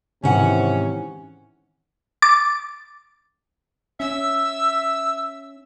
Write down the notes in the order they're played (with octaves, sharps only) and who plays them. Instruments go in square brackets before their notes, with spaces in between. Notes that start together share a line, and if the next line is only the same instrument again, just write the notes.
[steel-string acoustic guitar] G#2 F#5 [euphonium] C3 [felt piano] D#3 E3 [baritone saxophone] C#4
[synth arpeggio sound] D6 A6
[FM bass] C#4 [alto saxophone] E5 [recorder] E6